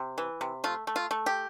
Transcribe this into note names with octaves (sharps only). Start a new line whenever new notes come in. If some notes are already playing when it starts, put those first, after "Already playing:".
Already playing: C3
E3
C3
A3 F4
A3
F4
A3
G4